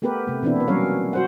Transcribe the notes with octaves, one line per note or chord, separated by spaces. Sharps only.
A3 B3 G4 A#4 B4
C3 A3
B2 E3 B3 C4 D4 E4
A#3 B4
F#3 G3 C#4 A#4 C#5 F5
F#4 C5 F#5